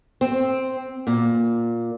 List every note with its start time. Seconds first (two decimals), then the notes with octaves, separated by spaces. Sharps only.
0.21 C4
1.07 A#2